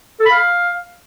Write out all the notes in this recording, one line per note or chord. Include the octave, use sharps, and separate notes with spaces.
A4
B5
F5